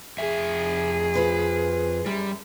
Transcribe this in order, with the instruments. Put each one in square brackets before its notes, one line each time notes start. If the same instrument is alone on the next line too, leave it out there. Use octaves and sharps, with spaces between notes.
[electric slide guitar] F2 E5 [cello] G#4
[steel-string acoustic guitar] F4 B4 C5
[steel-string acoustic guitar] F#2 [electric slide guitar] G3